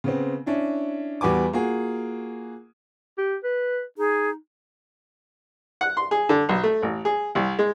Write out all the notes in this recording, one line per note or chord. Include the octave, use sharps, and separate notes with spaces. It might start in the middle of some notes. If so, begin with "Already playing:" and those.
C#3 B3 C4
C#4 D4 E4
E2 G3 F#4 B4 G#5 D6
A#3 F4 F#4 G#4
G4
B4
D#4 G#4
F#5
C6
G#4
D3
B1
A3
A1
G#4
C2
G#3